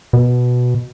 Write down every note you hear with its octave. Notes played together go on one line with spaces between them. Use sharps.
B2